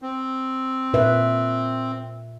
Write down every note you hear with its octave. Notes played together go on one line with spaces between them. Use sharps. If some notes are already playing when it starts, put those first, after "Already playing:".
C4
A#2 B4 E5